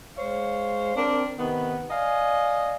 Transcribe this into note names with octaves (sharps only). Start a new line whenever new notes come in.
G#3 C5 C#5 F5
C4 D4 A#4
C3 D#3 B3
D5 D#5 F5 G#5